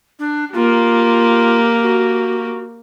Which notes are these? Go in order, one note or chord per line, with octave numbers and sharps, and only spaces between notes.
D4
A#3 F4 G4
F#4